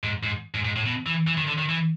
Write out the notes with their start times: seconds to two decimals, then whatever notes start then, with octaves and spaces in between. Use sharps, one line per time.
0.03 G#2
0.23 G#2
0.54 G#2
0.65 G#2
0.76 A2
0.86 B2
1.06 E3
1.27 E3
1.37 D#3
1.47 D3
1.58 D#3
1.69 E3